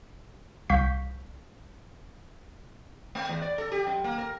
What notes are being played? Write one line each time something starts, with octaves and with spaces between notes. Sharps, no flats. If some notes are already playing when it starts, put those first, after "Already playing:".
C2 F5 C#6 G6 B6
A3
E2
D5
A4
G4
F#2
A#3
A#4